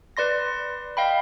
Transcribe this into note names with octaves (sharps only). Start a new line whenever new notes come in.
B4 D5 C6 A#6
D#5 F5 G5 B5